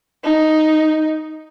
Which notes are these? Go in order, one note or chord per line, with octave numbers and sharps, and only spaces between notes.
D#4